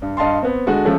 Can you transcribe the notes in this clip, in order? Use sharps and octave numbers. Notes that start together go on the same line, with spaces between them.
G2
G2 D#5 F5 A5 C6
B3 C4
D3 G#3 F#4 A4
C#3 F3 G#3 A3 C#4